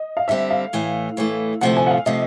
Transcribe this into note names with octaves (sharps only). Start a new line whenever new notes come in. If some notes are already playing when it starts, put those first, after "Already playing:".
Already playing: D#5
F5
D3 G3 C4 E5
F5
A2 E3 A3
A2 E3 A3
D2 C3 F3 A3 F#5
G#5
F#5
F5
C3 F3 A3 D#5